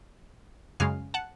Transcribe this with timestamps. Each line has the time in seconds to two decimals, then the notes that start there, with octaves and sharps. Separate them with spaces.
0.80 F#2 C#3 G#3 F5 G#5
1.14 F#5 A5